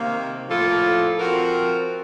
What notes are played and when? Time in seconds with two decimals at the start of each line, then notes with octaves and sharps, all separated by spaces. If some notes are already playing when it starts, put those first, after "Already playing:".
Already playing: C3 D#3 A#3
0.47 A2 F3 A#3 F4 A4
1.19 F3 C4 F#4 A#4